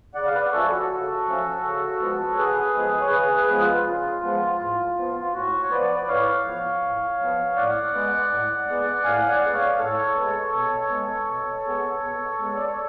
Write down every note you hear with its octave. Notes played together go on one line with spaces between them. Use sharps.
C#3 D5 F#5
F5
B4 D5
D5
F3 A3 C#4 A4 C#5
F#4 A4
C#3
F3 A3 C#4
C#3
F3 G#3 B3
C#5
C#3 G#4 B4
F3 G#3 B3
C#5
C#3 G#4 B4
G#4 B4
F3 G#3 B3
F4
C#3 F4
F3 G#3 B3
A2
F3 B3
F4
A2 F#4
C#5
F3 B3 B4 D5
A2 C#5 F5
F3 B3
A2
F3 B3
A2 D5 F#5
G#3 B3
A2
G#3 B3
A2 F5 G#5
D5 F#5
G#3 B3
C#5 F5
A2 A4 C#5
B3
G#3
B2
G#3 B3
B2
G#3 B3
B2
G#3 B3
D5
C#5